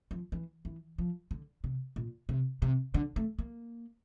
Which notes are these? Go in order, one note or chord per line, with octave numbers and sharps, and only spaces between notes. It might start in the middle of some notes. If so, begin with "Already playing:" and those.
F3
E3
E3
F3
D3
C3
A#2
C3
C3
D3
A3
A#3